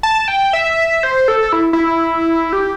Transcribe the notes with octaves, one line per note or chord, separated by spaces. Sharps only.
A5
G5
E5
C5
A4
E4
E4
G4